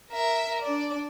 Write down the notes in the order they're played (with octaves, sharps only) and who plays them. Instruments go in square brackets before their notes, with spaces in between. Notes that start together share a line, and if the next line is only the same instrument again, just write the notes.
[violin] A#4 E5
D4 D5